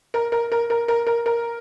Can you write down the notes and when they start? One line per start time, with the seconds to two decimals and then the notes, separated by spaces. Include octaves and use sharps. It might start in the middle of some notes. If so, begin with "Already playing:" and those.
0.14 A#4
0.32 A#4
0.52 A#4
0.70 A#4
0.88 A#4
1.07 A#4
1.26 A#4